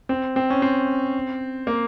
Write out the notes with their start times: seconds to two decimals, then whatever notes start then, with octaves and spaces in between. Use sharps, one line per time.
0.09 C4
0.36 C4
0.50 C#4
0.62 C4
1.67 A#3